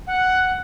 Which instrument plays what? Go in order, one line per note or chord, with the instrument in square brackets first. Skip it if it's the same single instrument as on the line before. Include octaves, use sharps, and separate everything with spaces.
[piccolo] F#5